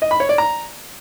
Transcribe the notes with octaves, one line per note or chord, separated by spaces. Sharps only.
D#5
B5
C#5
D5
A#5